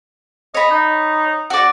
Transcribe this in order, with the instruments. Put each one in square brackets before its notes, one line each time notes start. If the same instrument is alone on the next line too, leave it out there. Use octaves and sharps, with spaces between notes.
[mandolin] C#5 B5 [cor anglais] D#5
[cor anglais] D#4
[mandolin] F#4 D5